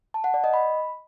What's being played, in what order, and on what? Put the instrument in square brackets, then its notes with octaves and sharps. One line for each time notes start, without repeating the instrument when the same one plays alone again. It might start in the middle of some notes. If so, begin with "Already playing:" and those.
[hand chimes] A5
F#5
D5
D#5
B5